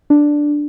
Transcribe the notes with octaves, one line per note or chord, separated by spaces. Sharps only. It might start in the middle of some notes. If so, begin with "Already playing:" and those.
D4